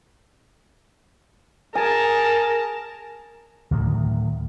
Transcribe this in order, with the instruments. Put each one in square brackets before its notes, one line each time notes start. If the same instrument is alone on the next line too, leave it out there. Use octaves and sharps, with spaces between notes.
[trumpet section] G#4 A5 [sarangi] A#4 [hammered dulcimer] G#5
[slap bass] D2 A2 D#3 F#3